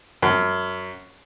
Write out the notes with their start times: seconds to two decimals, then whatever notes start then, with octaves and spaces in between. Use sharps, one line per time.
0.22 F#2